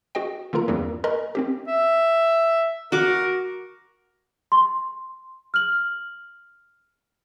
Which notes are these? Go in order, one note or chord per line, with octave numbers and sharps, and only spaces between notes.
F#4 G#4 D#5 G5
D3 A#3 F4 A#4 A#5
E2 G2 E3 G3 A#3 C4
A#4 D#5 G#5 A#5 B5 C#6
C4 C#4 G4
E5
F#4 A#4 D6
C6
F6 F#7